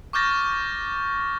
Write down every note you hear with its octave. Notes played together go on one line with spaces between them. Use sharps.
C#6 D6 F6 G6 A6 A#6